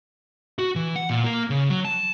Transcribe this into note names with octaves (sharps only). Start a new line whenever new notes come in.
F#4
E3
F#5
A#2
A#3
C#3
F#3
A5